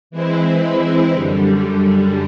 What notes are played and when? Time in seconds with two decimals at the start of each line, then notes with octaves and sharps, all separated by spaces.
0.11 E3 G#3 C4 E4
1.11 F#2 D3 G3